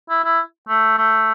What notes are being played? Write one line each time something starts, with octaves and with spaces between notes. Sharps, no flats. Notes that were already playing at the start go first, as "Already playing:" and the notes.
E4
E4
A3
A3